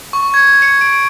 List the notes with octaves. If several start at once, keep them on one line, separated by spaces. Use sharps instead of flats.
C#6
G#6
C#7
D7